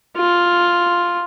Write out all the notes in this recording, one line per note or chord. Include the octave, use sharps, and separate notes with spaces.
F4